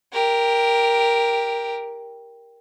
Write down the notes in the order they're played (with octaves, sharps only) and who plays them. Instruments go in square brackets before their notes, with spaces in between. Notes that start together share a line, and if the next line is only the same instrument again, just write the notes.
[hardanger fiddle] G4 A#4